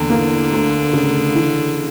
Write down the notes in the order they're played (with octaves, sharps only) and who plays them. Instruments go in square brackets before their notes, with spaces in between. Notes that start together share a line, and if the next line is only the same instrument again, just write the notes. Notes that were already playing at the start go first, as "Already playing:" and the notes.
Already playing: [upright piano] E2 A#2 [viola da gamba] D3
[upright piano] A#3
D2
C#3
E3